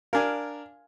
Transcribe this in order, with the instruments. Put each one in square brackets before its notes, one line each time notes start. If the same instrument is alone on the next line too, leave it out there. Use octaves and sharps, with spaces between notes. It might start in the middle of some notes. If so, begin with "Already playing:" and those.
[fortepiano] D4 A#4 [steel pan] F5 G#5